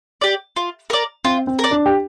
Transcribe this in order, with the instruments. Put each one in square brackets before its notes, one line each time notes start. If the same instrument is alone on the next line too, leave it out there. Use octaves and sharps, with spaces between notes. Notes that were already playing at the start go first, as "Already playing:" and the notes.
[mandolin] G4 D5
F4
A#4 D5
[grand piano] C4 [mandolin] F4
[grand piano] C4
[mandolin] A#4 D5
[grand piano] D4
G4